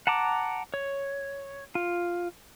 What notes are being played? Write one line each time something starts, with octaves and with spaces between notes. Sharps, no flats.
F#5 A5 A#5 D6
C#5
F4